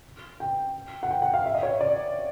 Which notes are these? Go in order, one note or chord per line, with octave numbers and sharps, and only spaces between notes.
G5
F#5
G5
F#5
F5
E5
D#5
C#5
D5